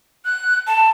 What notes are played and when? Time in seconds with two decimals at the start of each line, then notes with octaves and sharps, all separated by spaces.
0.25 F#6
0.67 A5